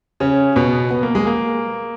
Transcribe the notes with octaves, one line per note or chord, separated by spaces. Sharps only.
C#3 C#4
B2 B3
B3
A#3
G#3
A#3